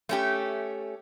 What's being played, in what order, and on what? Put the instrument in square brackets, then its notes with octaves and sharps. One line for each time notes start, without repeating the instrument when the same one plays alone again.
[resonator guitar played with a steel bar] A3 C#4 G4